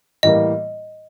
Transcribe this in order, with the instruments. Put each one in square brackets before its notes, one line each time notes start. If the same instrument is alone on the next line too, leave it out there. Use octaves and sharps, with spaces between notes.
[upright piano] A2 E3 G3 A#3 [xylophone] D#5